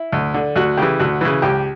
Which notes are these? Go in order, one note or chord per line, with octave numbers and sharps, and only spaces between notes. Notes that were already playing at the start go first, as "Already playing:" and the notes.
Already playing: E4
D2
D3
D2 F#4
C#3 E3 G4
D2 F#4
C#3 E3
C#2 G4